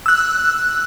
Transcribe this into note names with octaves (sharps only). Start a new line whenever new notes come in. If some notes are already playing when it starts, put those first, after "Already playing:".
E6 F#6